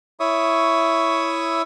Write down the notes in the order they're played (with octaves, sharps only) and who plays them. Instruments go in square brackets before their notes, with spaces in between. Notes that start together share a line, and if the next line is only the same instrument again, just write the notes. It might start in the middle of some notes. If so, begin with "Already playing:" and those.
[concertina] E4 C#5 E5 C#6 D#6